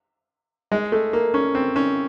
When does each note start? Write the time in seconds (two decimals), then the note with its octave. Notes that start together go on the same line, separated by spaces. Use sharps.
0.72 G#3
0.92 A3
1.13 A#3
1.34 C#4
1.55 C4
1.76 C#4